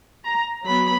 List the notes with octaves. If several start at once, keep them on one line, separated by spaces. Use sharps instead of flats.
A#5
F#3 B3 B5